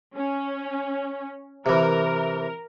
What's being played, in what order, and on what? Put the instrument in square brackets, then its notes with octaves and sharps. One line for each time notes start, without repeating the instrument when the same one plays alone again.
[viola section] C#4
[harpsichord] C3 E3 [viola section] A#4